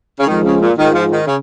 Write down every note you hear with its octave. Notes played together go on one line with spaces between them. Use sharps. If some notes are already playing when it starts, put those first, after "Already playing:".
C#3
F2 D#3 F3 G#3
C#3
A#2
G#2 D#3 G#3 F4
F3
D#3
C#3